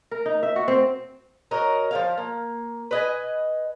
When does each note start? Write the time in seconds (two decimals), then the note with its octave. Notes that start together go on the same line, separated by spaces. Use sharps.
0.11 A#4
0.26 D#4
0.43 E5
0.56 F#4
0.68 C4
1.51 F#4 A#4 C#5 D#5
1.91 F3 A#3 F5
2.18 A#3
2.91 B4 D#5 G#5